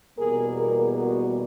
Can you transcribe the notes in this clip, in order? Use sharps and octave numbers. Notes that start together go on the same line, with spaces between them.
E2 B2 G3 A#3 G#4 A#4
G#4 A#4
F#4 G#4